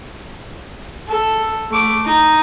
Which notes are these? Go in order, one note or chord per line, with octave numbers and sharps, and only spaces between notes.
A4
A3 D6
D#4